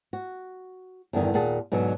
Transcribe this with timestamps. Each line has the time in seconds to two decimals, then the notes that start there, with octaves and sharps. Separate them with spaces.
0.13 F#4
1.13 E2 G2 D3 D#3
1.34 D#2 A#2 G#4 F#5 A5
1.72 G#2 B2 D3 F#3